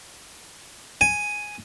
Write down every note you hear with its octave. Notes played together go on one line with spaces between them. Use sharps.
G#5